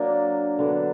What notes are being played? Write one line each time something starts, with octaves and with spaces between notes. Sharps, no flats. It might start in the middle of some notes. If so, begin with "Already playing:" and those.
Already playing: F#3 A#3 D4
D3 F#3 B3 D4